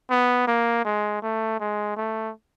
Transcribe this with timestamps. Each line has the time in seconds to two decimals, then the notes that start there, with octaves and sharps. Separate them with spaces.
0.10 B3
0.47 A#3
0.85 G#3
1.22 A3
1.60 G#3
1.97 A3